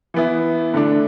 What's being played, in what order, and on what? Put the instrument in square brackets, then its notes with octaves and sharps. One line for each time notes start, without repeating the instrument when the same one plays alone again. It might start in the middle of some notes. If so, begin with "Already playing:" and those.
[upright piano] E3 B3 E4
D3 A3 D4